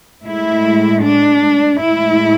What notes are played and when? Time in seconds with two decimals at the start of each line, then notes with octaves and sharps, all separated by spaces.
0.23 A2 G#3 E4
1.02 D4
1.81 A2 G#3 E4